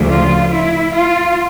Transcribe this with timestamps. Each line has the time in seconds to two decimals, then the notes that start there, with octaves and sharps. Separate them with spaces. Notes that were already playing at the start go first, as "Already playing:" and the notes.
Already playing: D2 C#3 F3 A3 D4
0.09 F4
0.52 E4
0.94 F4